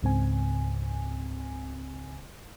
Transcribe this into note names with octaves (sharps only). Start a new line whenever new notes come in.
C#2 G#2 C#3 C4 G#5